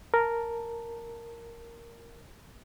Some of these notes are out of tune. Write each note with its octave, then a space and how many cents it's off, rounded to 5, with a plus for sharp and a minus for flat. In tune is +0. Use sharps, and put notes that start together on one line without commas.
A#4 +0 A5 +0